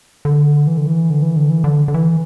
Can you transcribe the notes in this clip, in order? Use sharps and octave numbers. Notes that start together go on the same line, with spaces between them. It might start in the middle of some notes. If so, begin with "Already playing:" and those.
D3
E3
D3
E3
D3
E3
D3
E3
D3
D3
E3